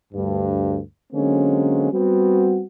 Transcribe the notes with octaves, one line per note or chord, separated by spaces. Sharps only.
D2 G2
D3 F#3 G#3 A#3 C4 C#4
G3 B3 C4 F#4